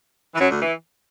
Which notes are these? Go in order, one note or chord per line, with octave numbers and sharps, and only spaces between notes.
E3
F#2 F#3
D2 D3
E3